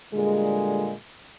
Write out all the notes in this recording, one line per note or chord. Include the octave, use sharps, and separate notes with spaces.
A#2 D3 G3 G#3